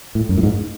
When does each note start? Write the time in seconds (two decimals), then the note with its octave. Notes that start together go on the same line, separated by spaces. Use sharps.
0.15 A2
0.29 F#2
0.38 A2
0.43 G#2